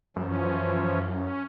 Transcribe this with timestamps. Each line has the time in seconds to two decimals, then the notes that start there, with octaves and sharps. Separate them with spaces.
0.16 F#2 E3 F3 C#4
1.10 C#4